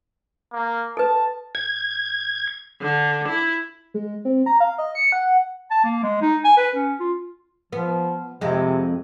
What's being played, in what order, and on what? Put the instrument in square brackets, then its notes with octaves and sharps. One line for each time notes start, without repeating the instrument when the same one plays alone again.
[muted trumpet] A#3
[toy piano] A4 B4 [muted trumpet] A5
[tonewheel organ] G#6
[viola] D3
E4
[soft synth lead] G#3
C4
A#5
F5
D#5
C#7
F#5
[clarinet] A5
A#3
G#3
D#4
G#5
B4
C#4
F4
[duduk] F3 [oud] B3
[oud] F2 G#3 [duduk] C3